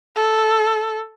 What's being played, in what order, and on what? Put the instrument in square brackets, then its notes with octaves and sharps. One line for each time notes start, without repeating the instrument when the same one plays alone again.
[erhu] A4